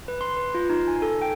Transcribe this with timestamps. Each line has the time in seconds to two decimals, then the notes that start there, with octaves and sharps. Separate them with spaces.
0.08 B4
0.21 C6
0.37 B4
0.55 F4
0.70 D#4
0.88 G#5
1.02 A4
1.22 G5